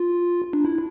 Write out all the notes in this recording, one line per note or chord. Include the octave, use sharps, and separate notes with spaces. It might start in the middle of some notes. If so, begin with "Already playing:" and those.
Already playing: F4
D4
E4